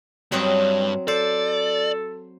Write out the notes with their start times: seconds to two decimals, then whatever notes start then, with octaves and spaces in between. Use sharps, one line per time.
0.32 G2 F#3 C4 D#5
1.08 A4 C5 D5